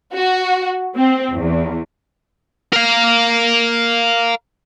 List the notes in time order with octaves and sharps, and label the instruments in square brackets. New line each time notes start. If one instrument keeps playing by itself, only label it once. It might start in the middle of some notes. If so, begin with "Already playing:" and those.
[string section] F#4
C4
E2
[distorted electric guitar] A#4 F5